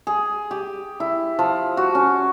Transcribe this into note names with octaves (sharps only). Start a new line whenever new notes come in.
G#4
G4
E4
F3
F#4
C#4